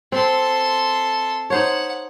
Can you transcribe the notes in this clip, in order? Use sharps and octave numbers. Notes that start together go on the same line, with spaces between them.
C4 A4 C6
D#4 C5 C#5 F#5